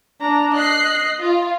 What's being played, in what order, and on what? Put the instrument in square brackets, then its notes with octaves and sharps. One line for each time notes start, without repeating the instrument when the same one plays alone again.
[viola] D4 A#5
[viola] D#5 [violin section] F#6 C7
[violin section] F4